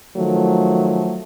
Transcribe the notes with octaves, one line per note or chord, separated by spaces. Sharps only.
D#3 F3 F#3 A3